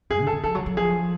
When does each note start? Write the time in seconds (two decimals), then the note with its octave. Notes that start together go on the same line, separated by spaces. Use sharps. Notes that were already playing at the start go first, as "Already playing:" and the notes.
0.10 F#2 G#4
0.21 D3
0.27 A4
0.32 D3
0.44 F3 A4
0.55 F#3
0.66 F#3
0.77 F3 G#4